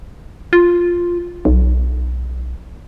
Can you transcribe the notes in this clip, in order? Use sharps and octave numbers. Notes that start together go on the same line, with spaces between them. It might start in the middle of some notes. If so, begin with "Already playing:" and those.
F4
B1